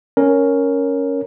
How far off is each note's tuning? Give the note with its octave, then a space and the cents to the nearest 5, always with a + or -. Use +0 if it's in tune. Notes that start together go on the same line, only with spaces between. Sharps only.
C#4 +0 A#4 +0 C#5 +0